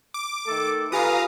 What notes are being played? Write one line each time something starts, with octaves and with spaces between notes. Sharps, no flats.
D6
D#3 A3 A4
F4 G4 B4 F5 G#5 A#5 D#6